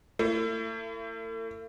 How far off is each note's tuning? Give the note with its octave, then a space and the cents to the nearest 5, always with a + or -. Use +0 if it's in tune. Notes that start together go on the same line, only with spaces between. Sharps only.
A3 +45 E4 +35